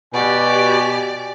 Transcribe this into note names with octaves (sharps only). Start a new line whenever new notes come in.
B2 G4 D5 G#5